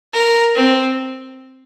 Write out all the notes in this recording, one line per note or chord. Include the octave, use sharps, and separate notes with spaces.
A#4
C4